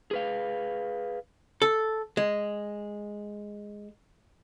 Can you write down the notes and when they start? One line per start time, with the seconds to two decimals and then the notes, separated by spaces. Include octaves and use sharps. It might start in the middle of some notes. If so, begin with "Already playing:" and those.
0.11 G#4 B4 F5
1.62 A4
2.17 G#3